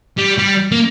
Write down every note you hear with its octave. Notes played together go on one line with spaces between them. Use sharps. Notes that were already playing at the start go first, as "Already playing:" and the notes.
G3
G3
A#3